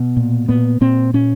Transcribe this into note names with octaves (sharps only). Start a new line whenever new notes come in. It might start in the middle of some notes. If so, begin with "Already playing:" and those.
Already playing: B2
A#2
A#2 B3
A#2 C4
A#2 C#4